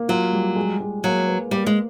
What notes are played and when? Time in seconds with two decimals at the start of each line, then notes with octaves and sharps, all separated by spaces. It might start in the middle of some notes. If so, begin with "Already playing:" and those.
Already playing: A#3
0.09 F#3 F4
0.33 G3
0.56 G#3
0.80 G#3
1.04 F#3 A#3
1.27 B4
1.51 G3 A#3
1.66 G#3